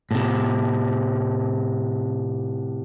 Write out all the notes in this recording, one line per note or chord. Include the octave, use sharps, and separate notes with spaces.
A2 C3